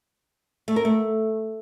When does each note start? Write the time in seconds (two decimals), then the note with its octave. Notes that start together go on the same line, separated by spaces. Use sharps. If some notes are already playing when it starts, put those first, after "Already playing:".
0.68 A3
0.76 A#4
0.85 A3